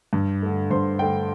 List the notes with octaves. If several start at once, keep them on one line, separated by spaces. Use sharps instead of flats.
G2
D3 A3
G2 C5 C6
D3 A3 G5